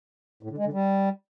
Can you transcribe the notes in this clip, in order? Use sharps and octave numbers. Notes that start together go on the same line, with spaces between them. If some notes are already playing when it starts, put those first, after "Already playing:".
A2
D3
G#3
D3
G3